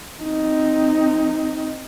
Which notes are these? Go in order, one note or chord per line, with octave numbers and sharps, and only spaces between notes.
C4 D#4